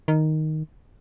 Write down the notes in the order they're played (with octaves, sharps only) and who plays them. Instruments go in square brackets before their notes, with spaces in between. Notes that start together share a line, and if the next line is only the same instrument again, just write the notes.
[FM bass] D#3